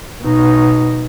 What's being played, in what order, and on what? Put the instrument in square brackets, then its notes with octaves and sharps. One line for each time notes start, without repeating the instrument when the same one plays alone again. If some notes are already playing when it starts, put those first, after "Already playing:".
[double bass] B2 D#4